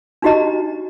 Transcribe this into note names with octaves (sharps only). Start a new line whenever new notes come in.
D4 D#4 F#4 G4 D#5 A#5